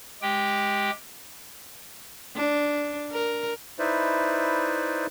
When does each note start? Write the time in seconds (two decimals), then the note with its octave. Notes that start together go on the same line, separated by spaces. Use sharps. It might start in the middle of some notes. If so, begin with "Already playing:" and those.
0.22 G#3 G4 G5
2.36 D4
3.11 A#4
3.79 D#4 E4 B4 C5 D5 E5